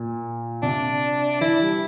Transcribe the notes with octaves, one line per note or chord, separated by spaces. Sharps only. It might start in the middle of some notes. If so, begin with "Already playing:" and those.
Already playing: A#2
C3 D4
E3 E4
G3